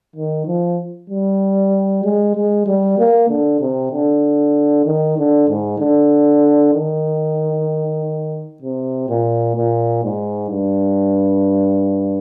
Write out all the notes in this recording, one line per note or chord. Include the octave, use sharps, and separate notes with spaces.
D#3
F3
G3
G#3
G#3
G3
A#3
D3
C3
D3
D#3
D3
G#2
D3
D#3
C3
A#2
A#2
G#2
G2